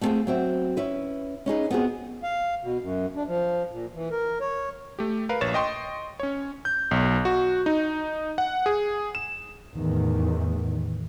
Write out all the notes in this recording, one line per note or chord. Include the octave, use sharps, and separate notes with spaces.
A3 B3 C4 D#4 F4 G#4
F#3 C4 E5
C#4 E4 B4
C#4 D#4 G#4 B4
B3 C4 F#4 G#4
F5
B2
F#2
D4
F3
A#2
E3
A#4
C#5
A3 G4
A#4 B4 F5
A#1 C#5 A6 E7
D#5 G5 C6 C#6
C#4 C#5
G6
B1
F#4
D#4
F#5
G#4
E7
E2 A2 D#3 E3